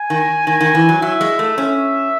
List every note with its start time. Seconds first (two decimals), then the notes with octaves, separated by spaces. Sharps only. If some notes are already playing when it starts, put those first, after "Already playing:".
Already playing: G#5
0.10 D#3
0.47 D#3 G#5
0.60 D#3
0.75 E3
0.89 F#3
1.02 F#3 E5
1.21 G#3
1.39 A3
1.57 C#4 E5